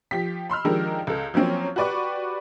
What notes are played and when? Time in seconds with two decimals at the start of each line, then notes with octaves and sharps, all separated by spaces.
0.11 F3 G4 B6
0.50 B5 C6 E6 F6
0.65 D#3 F3 G#3 D4 G4 A#4
1.07 C#2 A4
1.34 F3 F#3 A#3 C4 C#4
1.76 F#4 G4 B4 D5 C#6 D6